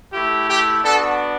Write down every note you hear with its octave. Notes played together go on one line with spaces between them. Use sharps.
A3 E4 G4
G4
B3 D4 F#4 A4